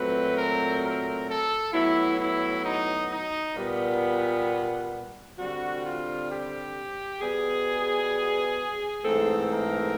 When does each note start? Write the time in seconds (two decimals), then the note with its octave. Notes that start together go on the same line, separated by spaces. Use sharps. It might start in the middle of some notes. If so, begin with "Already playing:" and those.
Already playing: A#2 F#3 A3 C4 B4
0.36 A#4
0.82 A#4
1.28 A4
1.73 A2 F#3 B3 E4
2.19 E4
2.64 D#4
3.10 D#4
3.56 A#2 G3 B3
5.38 D3 G3 C4 F#4
5.84 F4
6.29 G4
7.21 B2 G3 B3 G#4
9.03 G#2 E3 A3 C4 A4
9.50 A#4